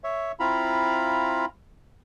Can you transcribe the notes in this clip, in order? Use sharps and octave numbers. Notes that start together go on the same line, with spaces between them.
C#5 E5
C4 E4 F4 F5 A#5 B5